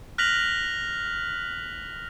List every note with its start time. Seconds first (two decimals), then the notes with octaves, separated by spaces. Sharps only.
0.18 F6 F#6 A#6 B6 F7 F#7